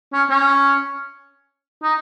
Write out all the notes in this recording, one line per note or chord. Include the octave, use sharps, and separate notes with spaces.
C#4
C#4
D#4